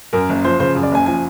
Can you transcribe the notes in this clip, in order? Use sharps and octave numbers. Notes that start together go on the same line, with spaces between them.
F#2 A#4
F#1
F3 C5
C#3 C5
F#2
D5
F#1 G#5
F3 G#5